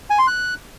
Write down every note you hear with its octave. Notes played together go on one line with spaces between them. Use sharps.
G#5
C6
F#6